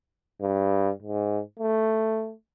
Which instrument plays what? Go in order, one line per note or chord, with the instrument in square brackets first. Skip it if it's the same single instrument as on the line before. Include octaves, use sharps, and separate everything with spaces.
[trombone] G2
G#2
A3